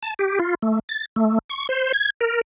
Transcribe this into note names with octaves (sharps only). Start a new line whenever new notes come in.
A5
G4
F4
A3
A6
A3
C#6
C5
G#6
A#4